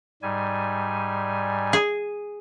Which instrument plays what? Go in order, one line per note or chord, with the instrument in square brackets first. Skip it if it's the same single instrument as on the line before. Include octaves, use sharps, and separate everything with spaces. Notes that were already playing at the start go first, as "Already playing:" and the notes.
[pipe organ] G#2 G3 G#5
[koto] G#4